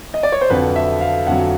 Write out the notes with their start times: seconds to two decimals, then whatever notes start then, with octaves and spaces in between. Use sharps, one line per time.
0.14 D#5
0.23 D5
0.32 C#5
0.41 C5
0.50 F2 D3 F#3 B4
0.76 E5
1.01 F5
1.27 F2 D3 F#3 F#5